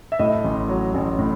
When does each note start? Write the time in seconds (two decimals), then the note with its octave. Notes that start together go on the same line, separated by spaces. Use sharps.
0.12 E5
0.19 A2 D#5
0.44 A1
0.69 F#3
0.94 A1
1.19 A2